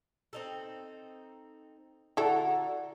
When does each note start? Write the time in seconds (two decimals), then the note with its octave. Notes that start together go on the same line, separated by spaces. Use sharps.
0.33 C4 D#4 A4
2.17 D3 E4 F#4 A4 A#5